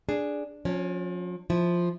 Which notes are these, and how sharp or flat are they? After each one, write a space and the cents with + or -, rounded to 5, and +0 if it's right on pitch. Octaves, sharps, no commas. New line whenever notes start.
D4 +0 G#4 +0
F3 +40 C#4 +0
F3 +0 E4 +0